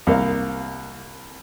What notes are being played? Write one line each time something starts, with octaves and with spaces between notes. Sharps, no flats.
C2 A#3 F5